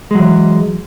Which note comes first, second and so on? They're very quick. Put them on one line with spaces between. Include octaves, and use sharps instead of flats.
G#3 F#3 E3